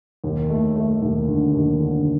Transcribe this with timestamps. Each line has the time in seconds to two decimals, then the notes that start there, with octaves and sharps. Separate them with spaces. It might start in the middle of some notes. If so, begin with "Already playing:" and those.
0.24 D#2
0.50 A3
0.76 A3
1.02 D#2
1.28 D3
1.54 D#2
1.80 D3